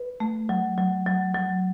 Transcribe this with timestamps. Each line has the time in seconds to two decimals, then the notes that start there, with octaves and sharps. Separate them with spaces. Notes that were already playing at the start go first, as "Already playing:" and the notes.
Already playing: B4
0.20 A3
0.49 F#3
0.78 F#3
1.06 F#3
1.35 F#3